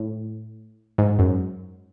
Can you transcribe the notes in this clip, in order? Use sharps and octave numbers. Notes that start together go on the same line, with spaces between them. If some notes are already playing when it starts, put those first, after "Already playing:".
Already playing: A2
G#2
F#2